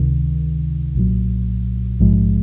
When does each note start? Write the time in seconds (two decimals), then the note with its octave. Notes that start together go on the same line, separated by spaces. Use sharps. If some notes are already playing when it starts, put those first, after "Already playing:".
Already playing: C#2 C3 D#3
0.95 B1 A#2 F#3
2.00 A#1 G#2 F3 G#3